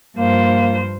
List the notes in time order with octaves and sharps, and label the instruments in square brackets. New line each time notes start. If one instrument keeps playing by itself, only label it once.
[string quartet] G2 F3 C5 [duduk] A#3